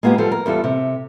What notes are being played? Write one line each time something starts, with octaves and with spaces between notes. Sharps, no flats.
G#3 A#3 B3 F4 G4
F3 G3 A4
A#4
E2 G3 F4 A4
C3